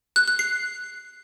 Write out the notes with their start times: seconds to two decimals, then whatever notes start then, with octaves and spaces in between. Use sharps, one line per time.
0.16 F#6
0.28 F#6
0.39 C7